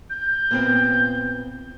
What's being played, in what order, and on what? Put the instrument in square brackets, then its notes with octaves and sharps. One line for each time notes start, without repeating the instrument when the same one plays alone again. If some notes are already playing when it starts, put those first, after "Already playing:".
[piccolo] G6
[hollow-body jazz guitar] A#2 B3 C4